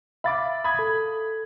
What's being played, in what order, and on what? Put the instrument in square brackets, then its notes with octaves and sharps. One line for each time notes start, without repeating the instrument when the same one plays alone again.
[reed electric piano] E5 F5 A6 [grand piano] B5 D6
[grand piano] B5 D#6 G#6
[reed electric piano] A4